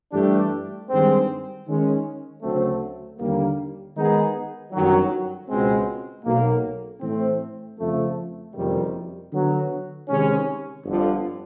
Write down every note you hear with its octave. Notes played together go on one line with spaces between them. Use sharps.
G2 E3 A3 D4 G4
G2 D#3 G#3 C4
D#3 G#3 C#4
D2 C#3 F#3 A3 C4
D#2 D3 G3 A#3
D#3 G#3 B3 D#4 G#4
G1 F#2 D#3 F#3
C#2 B2 G#3 C4
B1 B2 F#3 A#3
A2 E3 A3 C4
F2 C#3 F3 A3
F#1 F2 C3 D#3 G3
D3 F#3 B3
C3 D#3 G#3 C#4
G1 F2 D3 F3